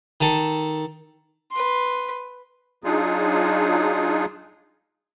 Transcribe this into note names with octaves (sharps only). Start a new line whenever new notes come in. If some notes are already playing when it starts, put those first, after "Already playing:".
D#3 A4
B4 C6
F#3 D4 D#4 F4 G#4